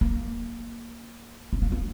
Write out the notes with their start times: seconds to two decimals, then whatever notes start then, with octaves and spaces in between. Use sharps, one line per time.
0.01 A#3
1.53 B3
1.62 A#3
1.72 B3